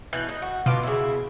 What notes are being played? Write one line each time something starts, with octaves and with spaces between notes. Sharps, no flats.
B2 E3 F#6 G6
D#4
F#4
B2 F4 D6
C#3 E4